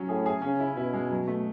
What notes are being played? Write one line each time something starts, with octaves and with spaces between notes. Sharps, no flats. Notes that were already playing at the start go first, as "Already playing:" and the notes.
Already playing: F#3 C#4
A2 G#4
G#4
C#3 C#4
E4
B2 E4
G#3
F#3
A3